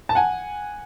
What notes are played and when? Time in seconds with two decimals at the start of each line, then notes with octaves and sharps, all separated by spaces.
0.09 A5
0.15 F#5 G#5